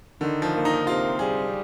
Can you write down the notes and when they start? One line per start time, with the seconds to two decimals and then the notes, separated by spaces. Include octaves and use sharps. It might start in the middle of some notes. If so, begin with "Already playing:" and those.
0.20 D3 D#3
0.42 F3
0.54 A#3
0.65 D#4
0.87 C3 F4
1.19 G3 G#4